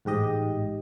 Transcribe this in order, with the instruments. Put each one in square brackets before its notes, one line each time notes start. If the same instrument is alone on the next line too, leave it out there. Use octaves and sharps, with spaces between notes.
[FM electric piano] A1 G#2 G4 D#5